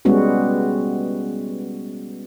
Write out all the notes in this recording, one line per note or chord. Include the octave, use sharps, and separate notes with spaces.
G3 G#3 B3 C#4 F#4